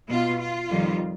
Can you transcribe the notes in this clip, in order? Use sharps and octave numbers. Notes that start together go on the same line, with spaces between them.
B2 B3 F4
F4
F2 D#3 G3